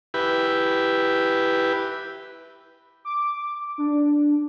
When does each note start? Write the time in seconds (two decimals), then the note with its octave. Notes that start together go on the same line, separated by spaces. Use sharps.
0.14 E4 G4 B4
3.05 D6
3.78 D4